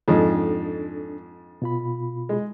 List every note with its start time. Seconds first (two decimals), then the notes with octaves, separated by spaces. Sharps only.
0.08 F2 G#2 D4 A4 D#5
1.62 B2 F4 B5
2.29 G#3